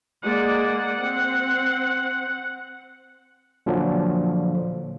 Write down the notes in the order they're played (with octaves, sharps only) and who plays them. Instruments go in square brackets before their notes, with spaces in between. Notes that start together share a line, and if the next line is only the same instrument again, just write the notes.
[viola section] G#3 A#3 D5 [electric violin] F#5
[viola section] C4
[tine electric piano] A#2 D3 F3 F#3